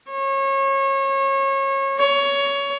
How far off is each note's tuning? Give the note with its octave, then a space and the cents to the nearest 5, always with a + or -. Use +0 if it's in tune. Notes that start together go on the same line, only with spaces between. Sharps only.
C#5 -30
C#5 +20